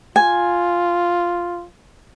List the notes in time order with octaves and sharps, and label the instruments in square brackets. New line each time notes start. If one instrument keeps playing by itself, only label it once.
[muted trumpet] F4 [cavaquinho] G#5